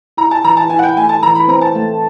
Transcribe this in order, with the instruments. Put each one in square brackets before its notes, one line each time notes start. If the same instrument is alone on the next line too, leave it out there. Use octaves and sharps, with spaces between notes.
[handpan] E4 [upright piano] A#5
[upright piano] A5
[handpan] E3 [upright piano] A#5
[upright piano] A5
[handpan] E4 [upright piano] G#5
[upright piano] F#5
G5
[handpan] A3 [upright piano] G#5
[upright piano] A5
[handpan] E3 [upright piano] A#5
[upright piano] B5
[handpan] C4 [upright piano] A#5
[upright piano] A5
[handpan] A3